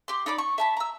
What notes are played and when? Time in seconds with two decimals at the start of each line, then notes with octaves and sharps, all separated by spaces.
0.08 G4 C6
0.26 D#4 D5 B5 D6
0.38 C#6
0.58 E5 A5 B5
0.77 A#5 E6